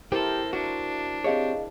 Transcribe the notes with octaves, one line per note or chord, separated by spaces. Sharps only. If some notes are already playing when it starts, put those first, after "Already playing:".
E4 G4 A4 A#4 C5
D4 F#4
C4 G4 G#4 C#5 D#5 F5